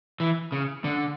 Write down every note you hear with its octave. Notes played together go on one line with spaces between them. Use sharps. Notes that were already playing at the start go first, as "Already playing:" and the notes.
E3
C#3
D3